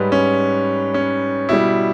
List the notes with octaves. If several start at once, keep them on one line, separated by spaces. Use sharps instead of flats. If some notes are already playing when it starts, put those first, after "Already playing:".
Already playing: G#2 G3 B4 C#5
C#4
C#4
B2 G3 E4